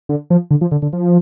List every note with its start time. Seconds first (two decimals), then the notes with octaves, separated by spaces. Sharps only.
0.09 D3
0.30 F3
0.51 D3
0.61 F3
0.71 D3
0.82 D3
0.93 F3